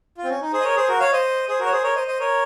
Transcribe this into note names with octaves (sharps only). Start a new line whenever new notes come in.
F4
C4
C#4
D#4
G#4 C5
D#5
A#4 C#5
G#4 C5
F#4 A#4
C#5 F5
C5 D#5
G#4 C5
F#4 A#4
C#5
G#4 C5
A#4 C#5
C5 D#5
C5 D#5
A#4 C#5